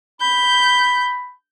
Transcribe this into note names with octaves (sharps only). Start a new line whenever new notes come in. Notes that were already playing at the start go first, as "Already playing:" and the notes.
B5 G6